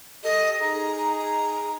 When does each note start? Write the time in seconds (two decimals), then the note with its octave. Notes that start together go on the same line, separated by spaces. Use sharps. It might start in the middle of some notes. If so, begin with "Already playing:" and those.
0.24 G4 A4 D#5
0.61 D#4 G#4 A#5